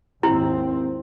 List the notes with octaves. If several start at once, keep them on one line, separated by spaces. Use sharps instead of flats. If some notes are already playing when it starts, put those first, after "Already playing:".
G#1 D#2 C4 E4